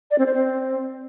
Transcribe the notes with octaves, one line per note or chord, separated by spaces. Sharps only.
D5
C4
C5
C4